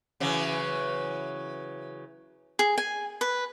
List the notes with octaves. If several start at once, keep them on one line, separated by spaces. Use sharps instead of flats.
C#3 E3 F#3
G#4
G#5
B4